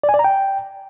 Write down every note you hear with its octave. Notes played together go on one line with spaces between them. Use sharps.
D5
G#5
D5
A#5
G5